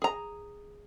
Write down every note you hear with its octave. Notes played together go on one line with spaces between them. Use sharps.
G#4 A#5